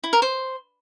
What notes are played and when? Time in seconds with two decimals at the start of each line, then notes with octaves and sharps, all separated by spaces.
0.04 E4
0.13 A#4
0.22 C5